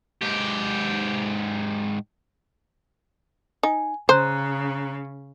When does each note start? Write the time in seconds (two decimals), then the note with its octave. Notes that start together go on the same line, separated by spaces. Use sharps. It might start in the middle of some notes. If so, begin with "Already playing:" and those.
0.22 G#2 G4
3.63 D#4 G#5
4.09 C#3 C5 A#5 F#6